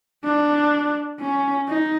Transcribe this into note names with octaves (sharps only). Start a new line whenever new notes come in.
D4
C#4
D#4